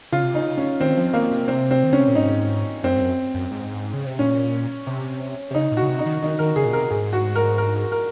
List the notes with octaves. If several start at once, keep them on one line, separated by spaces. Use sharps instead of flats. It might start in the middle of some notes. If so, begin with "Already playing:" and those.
C#3 F4
C3
C#3 D#4
C#4
D#3 C4
F3
D#3 A#3
C3
C4
C4
D#3
C#3 C#4
C3
A#2
G#2 D#4
F#2 C4
G#2
F#2
F#2
G#2
C#3
C3
A#2 C#4
C3
C3
C#3 D#4
A#2
C#3 F#4
C3
D#4
D#3
D#3 D#4
D#3 A#4
C#3 G#4
A#2
C3 A#4
G#2 G#4
F#4
A#4
A#4
A#4